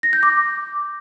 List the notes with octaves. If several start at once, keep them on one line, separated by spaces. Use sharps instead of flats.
A#6
G6
D6